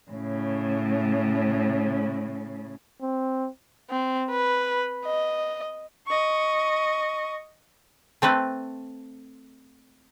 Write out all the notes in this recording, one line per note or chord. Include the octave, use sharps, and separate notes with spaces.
A2 C#3
C4
C4
B4
D#5
D#5 C#6
A3 C4 A4 B4